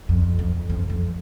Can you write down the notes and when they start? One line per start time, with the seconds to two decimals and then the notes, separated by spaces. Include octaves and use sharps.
0.09 F2
0.39 F2
0.70 F2
0.90 F2